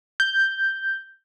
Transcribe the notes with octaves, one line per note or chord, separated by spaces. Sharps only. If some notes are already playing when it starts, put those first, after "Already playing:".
G6